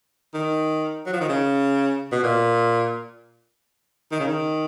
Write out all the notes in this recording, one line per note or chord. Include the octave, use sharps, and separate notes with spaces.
D#3
F#3
F3
D#3
C#3
B2
A#2
D#3
C#3
D#3